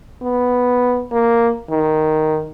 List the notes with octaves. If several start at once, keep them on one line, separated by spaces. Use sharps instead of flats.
B3
A#3
D#3